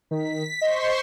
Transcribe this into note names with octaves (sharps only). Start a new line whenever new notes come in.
D#3 B6
C5 D#5 C6 C#6